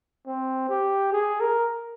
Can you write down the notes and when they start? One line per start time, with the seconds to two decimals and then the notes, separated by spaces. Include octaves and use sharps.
0.26 C4
0.69 G4
1.12 G#4
1.40 A#4